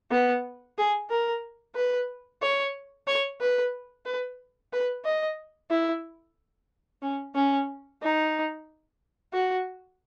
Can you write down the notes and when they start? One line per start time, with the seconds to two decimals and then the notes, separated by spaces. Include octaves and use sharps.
0.11 B3
0.78 G#4
1.10 A#4
1.76 B4
2.42 C#5
3.07 C#5
3.40 B4
4.06 B4
4.73 B4
5.05 D#5
5.70 E4
7.02 C#4
7.35 C#4
8.02 D#4
9.33 F#4